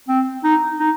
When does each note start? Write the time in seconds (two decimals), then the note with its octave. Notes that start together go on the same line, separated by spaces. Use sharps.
0.09 C4
0.44 D#4
0.80 D#4